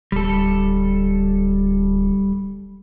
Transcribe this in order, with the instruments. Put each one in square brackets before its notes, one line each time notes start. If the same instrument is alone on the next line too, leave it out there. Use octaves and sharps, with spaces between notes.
[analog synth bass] D1 [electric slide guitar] G3 A4